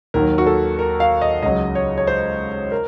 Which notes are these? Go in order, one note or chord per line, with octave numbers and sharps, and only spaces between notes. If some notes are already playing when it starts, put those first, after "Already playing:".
D#2 D#3 F#3 A#4
F#4
A4
A#4
F5
D#5
C#2 C#3 F#3 D#5
C#5
C#5
C5
A#4